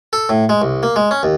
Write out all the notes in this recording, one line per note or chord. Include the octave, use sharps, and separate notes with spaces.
A4
A2
G#3
C2
A#3
G#3
C#4
D#2